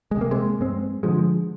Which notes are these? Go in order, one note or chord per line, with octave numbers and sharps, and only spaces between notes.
G#3
C3 A#3
G#3 C4
G2 G#3 C4
D3 F3 G#3